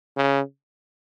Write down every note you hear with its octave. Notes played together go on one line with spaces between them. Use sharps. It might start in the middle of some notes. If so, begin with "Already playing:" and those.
C#3